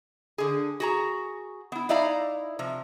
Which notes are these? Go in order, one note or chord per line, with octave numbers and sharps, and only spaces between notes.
D3 G#4
F#4 G#4 A#5
B3 E4
D#4 E4 D5 F5 A#5
C3 F3